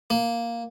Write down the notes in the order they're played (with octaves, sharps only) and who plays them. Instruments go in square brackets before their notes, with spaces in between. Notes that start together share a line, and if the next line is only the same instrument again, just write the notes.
[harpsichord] A#3